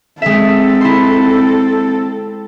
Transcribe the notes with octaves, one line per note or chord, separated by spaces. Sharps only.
G#3 C4 A4 E5
E4 C6